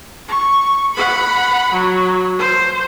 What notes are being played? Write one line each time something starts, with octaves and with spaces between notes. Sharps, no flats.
C#6
F#5 B5
F#3
C5